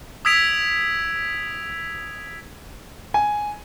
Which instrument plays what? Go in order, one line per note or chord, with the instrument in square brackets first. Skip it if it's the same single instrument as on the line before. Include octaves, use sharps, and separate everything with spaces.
[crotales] D#6 E6 G#6 B6 D7 F7
[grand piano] G#5